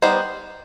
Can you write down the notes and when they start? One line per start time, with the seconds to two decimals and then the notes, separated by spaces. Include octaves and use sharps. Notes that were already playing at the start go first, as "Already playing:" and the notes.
0.02 G3 B3 D#4 C5